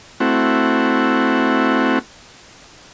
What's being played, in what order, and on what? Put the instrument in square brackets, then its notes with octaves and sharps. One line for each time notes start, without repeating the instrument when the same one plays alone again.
[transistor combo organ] A3 C4 E4 F#4